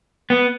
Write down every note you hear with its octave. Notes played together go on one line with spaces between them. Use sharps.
B3